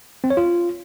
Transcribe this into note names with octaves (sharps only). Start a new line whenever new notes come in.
C4
C#5
F4